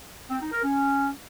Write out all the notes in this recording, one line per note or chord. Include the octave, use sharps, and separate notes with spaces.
C4
D#4
A#4
C#4